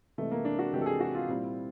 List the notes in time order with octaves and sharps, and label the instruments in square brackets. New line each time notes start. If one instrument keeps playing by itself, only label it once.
[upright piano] C3 E3 G#3 [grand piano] A3
[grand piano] A#3
D4
F#4
[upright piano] C3 E3 G#3 [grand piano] G4
[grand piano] A4
G#4
F#4
F4
[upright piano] A#2 G3 C4 E4